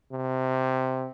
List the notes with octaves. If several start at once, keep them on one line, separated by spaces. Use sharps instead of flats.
C3